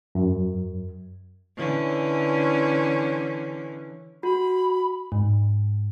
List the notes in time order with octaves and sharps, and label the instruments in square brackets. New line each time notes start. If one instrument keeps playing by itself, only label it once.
[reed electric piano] F#2
[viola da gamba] D3 E3 C#4
[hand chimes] F#4 [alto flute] B5
[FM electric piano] G#2